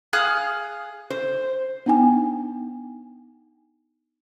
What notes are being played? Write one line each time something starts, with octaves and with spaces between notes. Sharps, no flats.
G#4 F5 D#6 F#6
C5
B3 D4 D#4 G5 G#5